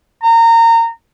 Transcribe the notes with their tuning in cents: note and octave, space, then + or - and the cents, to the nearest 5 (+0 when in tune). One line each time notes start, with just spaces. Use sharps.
A#5 -25